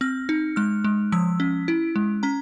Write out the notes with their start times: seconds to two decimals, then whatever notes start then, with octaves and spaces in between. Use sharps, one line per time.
0.01 C4 F6
0.29 D#4
0.56 G#3 F6
0.84 G#3
1.12 F3 E6
1.40 C#4
1.68 E4
1.96 G#3
2.23 C#4 A#5